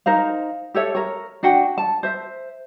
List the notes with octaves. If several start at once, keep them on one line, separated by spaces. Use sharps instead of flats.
D#4 A#4 C5 F5
G4 A4 C#5 E5
A#4 C#5
D4 F#4 F#5 G5
A5
C5 E5